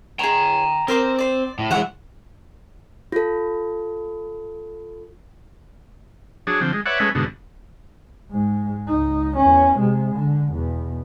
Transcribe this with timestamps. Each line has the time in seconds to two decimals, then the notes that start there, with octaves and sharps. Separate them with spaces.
0.19 G#4 C#5 G5 A#5
0.88 C4 A#4 C5 D6
1.19 C5 D5
1.59 A2
1.71 E3 G#3 C#5 E5 F#5
3.12 F4 A4
6.47 F#3 D4 G#4
6.62 D3 F3 C4
6.73 G#3
6.86 B4 C#5 D5 E5 F#5
7.00 G#3 A3 C#4 B4
7.15 G#2 B2 D3
8.31 G#2 G#3
8.87 C#2 D#4
9.37 E2 C#4
9.78 C3 G#3
10.14 D3
10.53 E2 B2